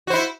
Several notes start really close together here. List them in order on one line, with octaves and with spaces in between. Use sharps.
F#4 C5 E4